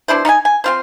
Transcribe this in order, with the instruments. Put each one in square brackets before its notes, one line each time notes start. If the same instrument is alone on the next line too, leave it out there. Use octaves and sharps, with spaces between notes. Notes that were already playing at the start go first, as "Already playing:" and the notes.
[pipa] B2 D4 E4 C5
D#4 D#5 F5 G#5
G#5
C4 F4 C5